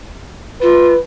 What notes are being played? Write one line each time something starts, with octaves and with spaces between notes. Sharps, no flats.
F4 B4